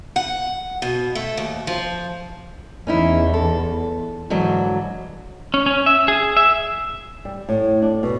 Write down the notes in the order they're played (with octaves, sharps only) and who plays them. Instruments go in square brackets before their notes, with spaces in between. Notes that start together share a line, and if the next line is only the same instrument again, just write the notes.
[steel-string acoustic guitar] F#5
B2
A3
D#2
F3
[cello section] E2 [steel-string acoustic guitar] C#4 D#4 E4
[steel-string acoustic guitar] A4
[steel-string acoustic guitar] G#2 D3 F#3 [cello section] E3
[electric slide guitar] C#4
C#4
E5
G#4
E5
[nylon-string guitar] G3
A2
D4
B2